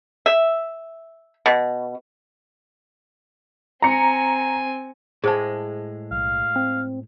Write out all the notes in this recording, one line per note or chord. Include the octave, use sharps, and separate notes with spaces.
E5
B2
C4 G#5 A#5 C#7
A2 G#3 G#4 C5 A5
B1 F5
C4